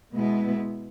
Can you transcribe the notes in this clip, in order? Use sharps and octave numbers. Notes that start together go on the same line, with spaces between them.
B2 G#3 B3 E4